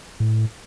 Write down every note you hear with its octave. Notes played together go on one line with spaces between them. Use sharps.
A2